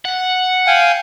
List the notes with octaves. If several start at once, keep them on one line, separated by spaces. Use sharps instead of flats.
F#5
F5 G5 G#5